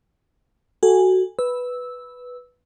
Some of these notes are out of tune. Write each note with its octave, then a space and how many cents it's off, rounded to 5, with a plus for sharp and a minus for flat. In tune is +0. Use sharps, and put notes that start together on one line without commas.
F#4 +10 A4 +0 G#5 -15
B4 +0 E6 -10